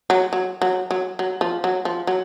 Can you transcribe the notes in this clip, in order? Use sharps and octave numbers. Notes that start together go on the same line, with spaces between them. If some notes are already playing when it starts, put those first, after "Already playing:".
F#3
F#3
F#3
F#3
F#3
F3
F#3
F3
F#3